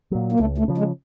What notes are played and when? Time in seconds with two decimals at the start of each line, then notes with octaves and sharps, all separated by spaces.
0.11 A#2 F#3
0.32 A#3
0.40 C#2 A3
0.58 A3
0.68 C#3 F3
0.78 G#3